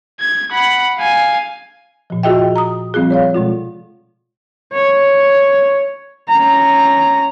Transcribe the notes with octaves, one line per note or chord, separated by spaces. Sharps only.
G#6
F#5 B5
F5 G#5
A#2 F3
F4 F#4 G#4 D#5 E5 G5
A#5 D#6
F3 G3 C4 F4 G#4
C#5 D5 F5
B2 G#3 F4
C#5
C#4 A#5